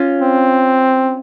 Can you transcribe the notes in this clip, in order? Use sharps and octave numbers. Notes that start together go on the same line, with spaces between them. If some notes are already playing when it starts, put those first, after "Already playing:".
Already playing: C#4 F4
C4